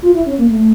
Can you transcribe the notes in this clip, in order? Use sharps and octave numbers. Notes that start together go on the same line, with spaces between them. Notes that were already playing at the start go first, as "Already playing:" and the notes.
F4
E4
C#4
A#3
A3